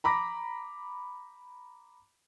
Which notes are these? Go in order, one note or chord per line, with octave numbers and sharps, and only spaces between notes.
A#5 B5 D6 A#6